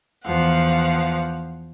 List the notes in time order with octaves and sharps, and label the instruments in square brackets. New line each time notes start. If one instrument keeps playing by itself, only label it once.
[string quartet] E2 F3 F5 F#5